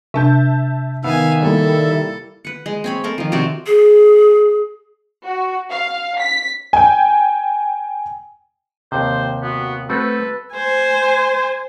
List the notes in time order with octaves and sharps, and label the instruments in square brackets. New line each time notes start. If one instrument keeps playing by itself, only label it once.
[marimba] C3 D4 [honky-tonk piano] E5 A5 G6
[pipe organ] D#3 E5 [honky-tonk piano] B3 [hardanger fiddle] F5 G#5
[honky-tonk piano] G3 A#3 E4 [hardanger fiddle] A4
[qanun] B4 F#5
G#3
C4 C#5 B5
C4 A4 A#4
D#3 F3
C3 C4 F#4 D5
[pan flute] G#4
[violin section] F#4
F5
B6
[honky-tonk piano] G5 G#5
[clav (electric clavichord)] D#2 C3 [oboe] C5
[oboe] B3 [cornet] F#4
[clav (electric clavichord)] A3 C4 F#4 [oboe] A4 [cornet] B4
[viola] C5 G#5